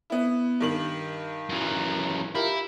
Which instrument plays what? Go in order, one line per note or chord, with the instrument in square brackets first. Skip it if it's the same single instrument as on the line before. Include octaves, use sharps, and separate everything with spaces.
[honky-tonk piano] B3 E4
G2 D#3 F#7
[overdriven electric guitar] F#2 E3
[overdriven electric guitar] E4 [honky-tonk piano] F4 G4 A#4